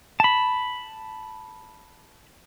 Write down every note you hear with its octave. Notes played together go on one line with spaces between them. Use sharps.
A5 B5